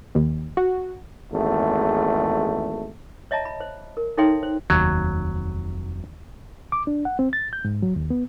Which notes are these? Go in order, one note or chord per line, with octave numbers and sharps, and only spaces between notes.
D#2
F#4
G#1 E2 A3
C#5 D#5 E5 A5 A#5
B5
C5
A#4
D#4 A4 C#5 E5 G5 C6
C5
F1 D#2 F#3
D6
D4
F#5
C4
A6
G6
G#2
F#3
D#2
B3